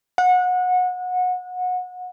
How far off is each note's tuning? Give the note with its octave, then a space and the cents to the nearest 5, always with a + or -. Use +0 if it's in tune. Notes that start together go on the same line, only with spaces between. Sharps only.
F#5 -25